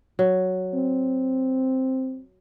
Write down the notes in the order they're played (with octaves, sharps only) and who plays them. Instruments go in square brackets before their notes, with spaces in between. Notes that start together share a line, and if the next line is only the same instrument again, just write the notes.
[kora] F#3
[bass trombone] C4